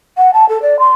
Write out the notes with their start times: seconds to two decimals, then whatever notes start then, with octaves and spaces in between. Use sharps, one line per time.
0.17 F#5
0.34 A5
0.49 A4
0.62 D5
0.79 C6